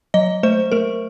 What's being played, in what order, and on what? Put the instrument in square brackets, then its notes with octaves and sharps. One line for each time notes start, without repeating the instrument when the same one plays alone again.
[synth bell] F#3 D#5
A3 C5
A3 A#4